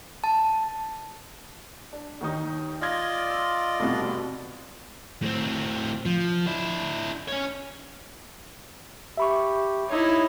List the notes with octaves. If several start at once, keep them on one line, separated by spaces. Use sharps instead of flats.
A5
D4
D#2 D#3 D#4
F4 D5 D#5 F6 G#6 A#6
E6
F1 C2 B2
A2 C4
F3
D4 E4
C#4 C#5
G4 E5 B5 C#6
D#4 E4 C#5